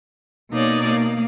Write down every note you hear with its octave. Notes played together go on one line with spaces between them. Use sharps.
B2 A#3 D#4 C#5 D5
A#3